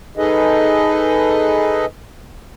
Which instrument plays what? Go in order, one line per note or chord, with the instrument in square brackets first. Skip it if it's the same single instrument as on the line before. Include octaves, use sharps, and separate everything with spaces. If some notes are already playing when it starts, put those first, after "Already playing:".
[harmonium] D#4 G#4 A4 B4 D#5